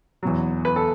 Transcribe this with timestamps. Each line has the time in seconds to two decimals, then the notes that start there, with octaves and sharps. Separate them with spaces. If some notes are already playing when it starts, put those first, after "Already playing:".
0.23 E2 B2 F#3
0.65 B4
0.76 A4